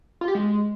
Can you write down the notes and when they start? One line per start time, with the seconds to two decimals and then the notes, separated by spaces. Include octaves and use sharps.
0.21 F4
0.28 G4
0.35 G#3